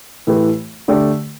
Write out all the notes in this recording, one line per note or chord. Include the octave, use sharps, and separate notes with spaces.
A2 E3 A3 G4 B4
D3 A3 G4 D5